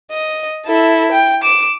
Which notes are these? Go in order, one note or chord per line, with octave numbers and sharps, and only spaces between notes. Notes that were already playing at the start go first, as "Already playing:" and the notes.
D#5
E4 A4
G5
D6 E7